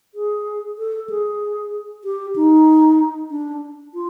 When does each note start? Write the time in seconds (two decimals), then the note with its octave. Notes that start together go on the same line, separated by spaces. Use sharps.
0.15 G#4
0.78 A4
1.10 G#4
2.04 G4
2.36 D#4
3.31 D4
3.94 F4